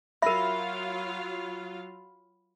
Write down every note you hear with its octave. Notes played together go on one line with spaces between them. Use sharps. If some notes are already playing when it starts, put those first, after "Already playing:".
F#3 F4 A#4 E5 F5 B5